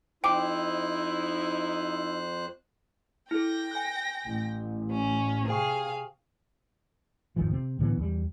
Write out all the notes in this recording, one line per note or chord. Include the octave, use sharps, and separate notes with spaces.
F2 D#4 E4 C5 G5 D6 F#6
E4 A4 G5 A#6
G#5 F#6
A1
C#4
C3 G#4 C5 F5 G5 C#6
G#1 F2 D#3 F3
C3 C4
A2 D3 E3 B3
E2 G3